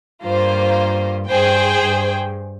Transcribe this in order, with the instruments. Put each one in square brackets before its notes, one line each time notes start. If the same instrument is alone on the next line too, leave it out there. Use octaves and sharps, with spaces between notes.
[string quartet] G2 [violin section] A#3 F4 C5
[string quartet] G2 [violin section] G#4 C5 G5
[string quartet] G2